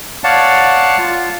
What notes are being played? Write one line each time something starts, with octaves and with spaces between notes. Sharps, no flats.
C#5 D5 F5 F#5 A5
F4